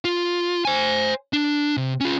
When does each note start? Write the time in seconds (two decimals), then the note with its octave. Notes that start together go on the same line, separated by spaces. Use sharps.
0.05 F4
0.65 C5 G#5
1.33 D4
1.77 C3
2.00 C#4 F4